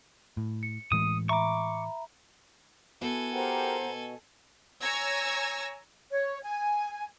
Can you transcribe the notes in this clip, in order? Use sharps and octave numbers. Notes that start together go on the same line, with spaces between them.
A2
C#7
A2 E3 G#3 D#6
E5 A#5 B5 C#6 D6
B3 E4 F#4 A4 G#5
G4 A#4 C5 F#5 G5 A#5
B2
C#5 G#5 A#5 E6 G#6 A#6
C#5
G#5